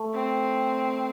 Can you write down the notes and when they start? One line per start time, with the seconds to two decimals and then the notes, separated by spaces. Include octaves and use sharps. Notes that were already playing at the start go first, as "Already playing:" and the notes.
Already playing: A3
0.14 C4